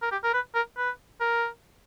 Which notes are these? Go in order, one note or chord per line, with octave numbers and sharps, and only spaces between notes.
A#4
G4
A#4
B4
A#4
B4
A#4